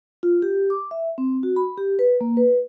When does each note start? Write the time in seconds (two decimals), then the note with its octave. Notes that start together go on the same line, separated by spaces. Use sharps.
0.23 F4
0.42 G4
0.70 D6
0.91 E5
1.18 C4
1.43 F#4
1.56 B5
1.78 G4
1.99 B4
2.21 A#3
2.37 B4